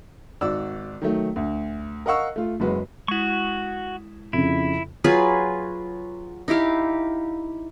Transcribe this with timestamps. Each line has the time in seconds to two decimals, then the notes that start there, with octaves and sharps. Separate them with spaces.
0.41 G#1 F#4 D5 E6
1.01 D#3 F#3 A3
1.36 D2
2.06 A#4 D#5 F5 F#5 C#6 E6
2.36 A3 F4
2.60 F#1 F#3 G#3 F#4 B4
3.08 G#3 E4 F#4 C#6
4.33 F2 C#3 E4
5.04 F#3 F4 G#4 B4
6.48 D#4 E4 G4 F5